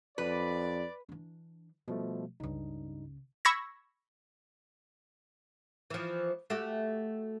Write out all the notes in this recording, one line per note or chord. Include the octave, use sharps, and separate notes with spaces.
F2 B4 D5
E3 D4
B2 F3 G3 A3
C#2 G2 C#3 D#4
B5 C#6 E6 G#6 A#6
E3 F3
A3 F#4 G4